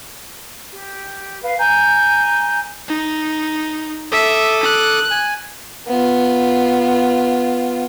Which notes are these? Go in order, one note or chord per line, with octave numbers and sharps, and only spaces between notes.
G4
B4 F5
G#5 A#5 G6
D#4
A4 E5 D6 D#6
F#6
G#5
B3 F4